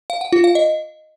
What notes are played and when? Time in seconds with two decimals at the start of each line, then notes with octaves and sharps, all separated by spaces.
0.10 F5
0.21 F#5
0.32 F4
0.44 F5
0.55 D#5